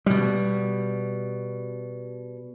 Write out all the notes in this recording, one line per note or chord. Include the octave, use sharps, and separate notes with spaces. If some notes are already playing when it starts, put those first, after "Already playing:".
B2 G3